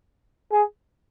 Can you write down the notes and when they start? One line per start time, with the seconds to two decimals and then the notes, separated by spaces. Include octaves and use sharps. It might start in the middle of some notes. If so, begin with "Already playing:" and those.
0.52 G#4